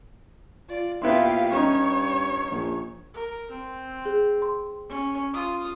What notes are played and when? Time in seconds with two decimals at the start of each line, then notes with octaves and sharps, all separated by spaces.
0.68 F4 D5
1.02 A#2 B3 E4 G4 F5 C6
1.52 G2 C#4 D#4 C#5
2.51 A#1
3.14 A#4
3.51 C4
4.06 G#4
4.42 C6
4.89 C#4
5.33 F4 D#6